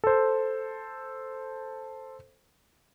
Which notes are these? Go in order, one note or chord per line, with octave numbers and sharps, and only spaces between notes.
A4 C5